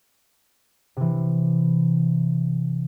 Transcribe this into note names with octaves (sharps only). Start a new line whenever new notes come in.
C3 E3